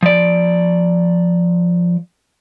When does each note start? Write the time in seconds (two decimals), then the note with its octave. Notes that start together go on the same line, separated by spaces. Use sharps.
0.03 F3 D5